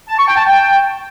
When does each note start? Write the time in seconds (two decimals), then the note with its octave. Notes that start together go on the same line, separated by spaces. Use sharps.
0.09 A5
0.19 C#6
0.28 G5
0.37 A5
0.47 G5